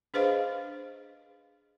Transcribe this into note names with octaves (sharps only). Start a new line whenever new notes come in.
D4 G#4 B4 C5 D#5 F5